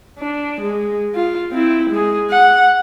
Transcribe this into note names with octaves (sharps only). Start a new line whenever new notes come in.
D4
G#3
F4
C4 E4
G#3 G#4
F#5